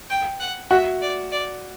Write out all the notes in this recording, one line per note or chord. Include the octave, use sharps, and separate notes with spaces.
G5
F#5
F#4 E5
D5
D5